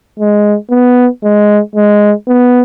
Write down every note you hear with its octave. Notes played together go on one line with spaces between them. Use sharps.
G#3
B3
G#3
G#3
B3